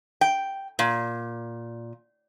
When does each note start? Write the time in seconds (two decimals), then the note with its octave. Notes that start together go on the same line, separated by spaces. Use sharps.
0.21 G5
0.79 A#2